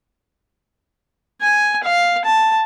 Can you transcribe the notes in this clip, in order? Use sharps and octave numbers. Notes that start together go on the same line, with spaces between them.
G#5
F5
A5